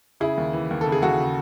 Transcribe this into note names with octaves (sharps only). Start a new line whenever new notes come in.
C#3 E4 G#4
D#2
E3
D#2
C#3 A4
G#4
D#2 F#4 A4
C#3